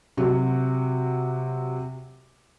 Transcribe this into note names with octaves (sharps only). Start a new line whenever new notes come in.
C3 F#3 F#4